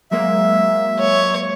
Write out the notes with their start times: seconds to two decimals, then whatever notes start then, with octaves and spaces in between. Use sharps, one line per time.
0.11 F#3 G#3 A#3 E5
0.99 C#5